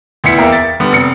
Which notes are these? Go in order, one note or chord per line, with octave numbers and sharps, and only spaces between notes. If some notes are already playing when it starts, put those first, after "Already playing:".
D2 B3 E4 B6 C#7
E2 A#3 A#4 E5 G5
A6
D3 G3 B3
F1 C#7